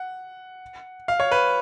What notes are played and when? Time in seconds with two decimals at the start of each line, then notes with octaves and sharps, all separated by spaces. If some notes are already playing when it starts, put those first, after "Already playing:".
Already playing: F#5
1.08 F5
1.20 C#5
1.31 B4